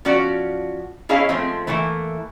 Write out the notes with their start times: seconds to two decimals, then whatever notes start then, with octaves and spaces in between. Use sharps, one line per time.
0.05 F3 C#4 F#4 D5
1.09 C#4 E4 G#4 C#5 D#5 F5
1.29 F3 G#3 A3 C4
1.67 E3 A3 A#3 E4